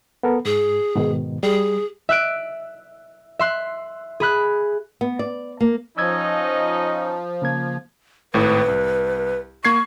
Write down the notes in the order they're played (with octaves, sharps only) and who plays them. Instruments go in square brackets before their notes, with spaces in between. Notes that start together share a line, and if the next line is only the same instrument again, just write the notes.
[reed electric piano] B3 A4 A#4
[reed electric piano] G#2 [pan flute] G#4
[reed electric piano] G#2 B2 D#3
[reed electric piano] G3 [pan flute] G#4
[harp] E5 F#6 D7
E5 C6 F#6
G#4 B5 F#6
[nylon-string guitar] B3
D5
A#3
[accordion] F3 [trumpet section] C#4 D#4 [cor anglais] D#5 [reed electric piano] E6 G#6
[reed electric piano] C#3 A#3 G#6
[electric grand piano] G#1 A2 [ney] B4
[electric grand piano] C2
[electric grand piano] A#3 G#6 C7 [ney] C#6